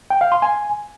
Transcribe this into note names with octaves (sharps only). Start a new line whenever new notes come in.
G5
F5
C6
G#5